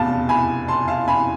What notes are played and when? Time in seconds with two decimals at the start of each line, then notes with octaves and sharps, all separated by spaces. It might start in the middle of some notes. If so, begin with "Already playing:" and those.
Already playing: F1 E2 B2 F5 A5
0.29 G#5 B5
0.68 A5 C6
0.88 F5 A5
1.08 G#5 B5